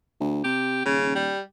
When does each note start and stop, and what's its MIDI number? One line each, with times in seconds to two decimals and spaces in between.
0.20 0.40 38
0.44 0.81 48
0.44 0.81 67
0.85 1.33 27
0.85 1.14 49
1.15 1.40 55